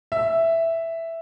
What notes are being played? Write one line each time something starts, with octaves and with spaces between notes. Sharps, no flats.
E5